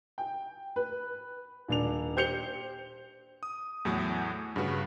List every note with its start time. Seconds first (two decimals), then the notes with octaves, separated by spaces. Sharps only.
0.18 G5
0.76 B4
1.68 D#1 D4 F7
2.16 G4 C5 G6 C#7 F7 G7
3.43 D#6
3.85 E2 A2 F#3 A3
4.56 G2 C#3 F#4 B4